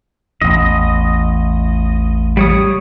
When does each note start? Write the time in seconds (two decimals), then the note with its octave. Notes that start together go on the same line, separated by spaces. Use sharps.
0.42 A1 E2 D#5
2.37 G3 C#5 D#6